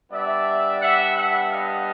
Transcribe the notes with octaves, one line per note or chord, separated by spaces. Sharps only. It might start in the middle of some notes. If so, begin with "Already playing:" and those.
G3 B3 D4 D5 E5
E5 F#5
E5 F#5
D#5 F5